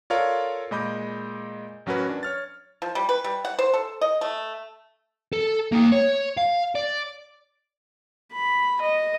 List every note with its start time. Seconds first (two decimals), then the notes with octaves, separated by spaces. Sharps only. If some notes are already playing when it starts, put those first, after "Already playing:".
0.10 F4 A4 A#4 C#5 D5 F5
0.71 A#2 G#3 D#5 B5 D6 G6
1.86 A1 F#3 C#4 F#4 A#4 B4
2.09 D4
2.23 C#5 F6 A6
2.82 F3
2.95 G3
3.09 B4
3.24 G3
3.45 F#5
3.59 C5
3.74 A4
4.01 D#5
4.21 A3
5.33 A4
5.72 A#3 G5
5.92 C#5
6.38 F5
6.75 D5
8.33 B5
8.82 D#5